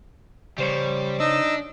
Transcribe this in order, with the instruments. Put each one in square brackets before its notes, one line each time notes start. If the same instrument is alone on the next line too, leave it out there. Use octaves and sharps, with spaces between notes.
[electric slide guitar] C#3 C5 C#5 [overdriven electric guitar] G3
[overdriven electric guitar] D4 [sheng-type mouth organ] D#4 D#5 E6